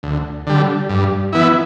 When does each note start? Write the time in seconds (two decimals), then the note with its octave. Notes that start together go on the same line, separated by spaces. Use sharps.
0.03 D2
0.47 D3 G3
0.89 G2
1.33 E3 B3 E4